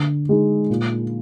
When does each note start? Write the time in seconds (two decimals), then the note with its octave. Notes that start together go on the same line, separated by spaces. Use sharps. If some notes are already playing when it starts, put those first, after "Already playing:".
Already playing: D3
0.29 G#3 D#4
0.70 A#2